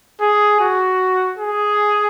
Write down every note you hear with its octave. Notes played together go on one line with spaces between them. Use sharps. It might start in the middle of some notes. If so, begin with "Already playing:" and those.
G#4
F#4
G#4